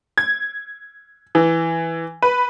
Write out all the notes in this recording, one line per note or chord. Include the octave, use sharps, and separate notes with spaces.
G#6
E3
B4